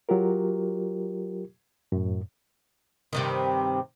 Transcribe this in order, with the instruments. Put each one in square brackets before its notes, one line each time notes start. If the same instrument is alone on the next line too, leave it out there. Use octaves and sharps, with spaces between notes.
[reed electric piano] F#3 F4 G4 A#4
F#2 A2
[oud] G2 C3 D#3